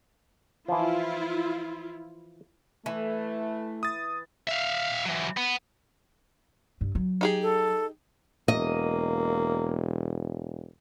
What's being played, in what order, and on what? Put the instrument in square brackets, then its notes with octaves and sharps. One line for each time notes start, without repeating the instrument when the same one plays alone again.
[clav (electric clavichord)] E3 F3 [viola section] E4 F4
[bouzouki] E3 [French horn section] A3
[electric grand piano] D#6 A6
[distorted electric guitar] E5 F5
E3 F#3
B3
[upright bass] G2
F#3
[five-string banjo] D#4 G4 G#4
[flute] A4
[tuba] E1 [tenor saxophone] A#3 [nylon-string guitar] D#5